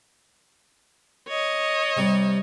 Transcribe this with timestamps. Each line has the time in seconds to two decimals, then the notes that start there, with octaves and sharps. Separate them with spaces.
1.28 C#5 D#5
1.97 C3 G3